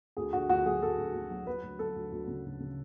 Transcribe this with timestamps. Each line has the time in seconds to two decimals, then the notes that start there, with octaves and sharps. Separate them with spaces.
0.17 D2 G#4
0.33 D3 F#4
0.49 D2 F#4
0.65 F#3 G#4
0.82 F#3 A4
0.98 D2
1.14 D2
1.30 F#3
1.47 F#3 B4
1.63 D2
1.79 F#3 A4
1.96 D2
2.12 D2
2.28 C#3
2.45 D2
2.60 C#3